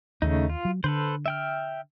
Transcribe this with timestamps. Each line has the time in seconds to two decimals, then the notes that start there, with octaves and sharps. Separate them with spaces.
0.22 D#2 C#3 A3 D#4
0.49 F4
0.65 F#3
0.84 D3 A4 B4 C5
1.26 E5 G5 F6